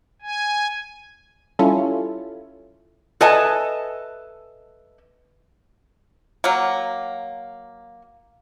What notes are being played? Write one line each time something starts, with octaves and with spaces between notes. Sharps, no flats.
G#5
G3 C#4 E4 F4 A4
A4 B4 D#5 E5 G#5 A5
F#3 A#3